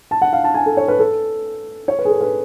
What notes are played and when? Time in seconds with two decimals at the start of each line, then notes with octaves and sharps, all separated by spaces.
0.11 A5
0.22 F#5
0.33 F5
0.44 A5
0.54 G#5
0.66 A4
0.77 C#5
0.88 B4
0.99 A4
1.88 C#5
1.99 B4
2.05 G#4
2.10 A4
2.21 B4